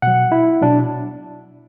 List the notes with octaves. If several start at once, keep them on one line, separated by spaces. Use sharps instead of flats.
B2 F#3 F#5
E4
B2 F#3 D4